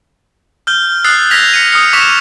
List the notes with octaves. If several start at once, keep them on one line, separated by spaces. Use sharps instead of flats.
F6 G6 G7
D#6 E6 F#6 A6 C7
F6 G#6 A#6 B6 F7
G#6 C#7 D#7
D#6 F6 C#7
C#6 D6 B6 E7 F7